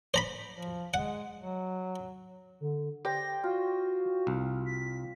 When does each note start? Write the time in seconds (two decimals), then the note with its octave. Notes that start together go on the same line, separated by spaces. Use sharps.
0.14 C5 A#5 B5
0.51 F3
0.94 G#3 F#5
1.37 F#3
2.60 D3
3.05 G4 C5 D5 G5 A#6
3.43 F4 F#4
4.27 C2
4.66 B6